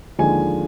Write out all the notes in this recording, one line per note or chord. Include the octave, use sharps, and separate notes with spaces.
D#2 D3 F3 G#3 G#5